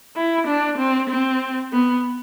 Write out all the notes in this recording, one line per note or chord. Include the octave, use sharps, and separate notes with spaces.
E4
D4
C4
C4
B3